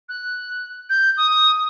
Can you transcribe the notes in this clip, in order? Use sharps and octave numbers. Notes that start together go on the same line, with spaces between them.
F#6
G6
D#6